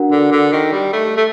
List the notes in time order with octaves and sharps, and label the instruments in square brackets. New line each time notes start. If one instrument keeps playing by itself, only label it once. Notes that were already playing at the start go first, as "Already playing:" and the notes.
Already playing: [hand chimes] D4 F#4 A#4 F#5
[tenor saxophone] D3
D3
D#3
G3
A3
A3